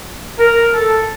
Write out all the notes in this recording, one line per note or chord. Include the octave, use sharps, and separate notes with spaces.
A#4
A4